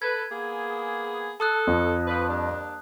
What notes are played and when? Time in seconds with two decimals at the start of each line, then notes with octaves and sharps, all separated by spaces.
0.02 A4 B4 G#6
0.31 A#3 B3 G#4
1.40 A4 A5 D#6 F#6
1.67 F2
2.07 F3 D4 B4
2.27 G3 A#3 D4